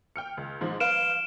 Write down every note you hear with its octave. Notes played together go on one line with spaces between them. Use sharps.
G5 F6 C#7
C#2
G#2 F3
B4 F5 F6 D7 E7